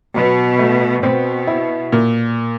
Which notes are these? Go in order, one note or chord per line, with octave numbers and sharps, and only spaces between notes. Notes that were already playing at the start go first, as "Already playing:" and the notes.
B2 F#3
A3
B2 C4
E4
A#2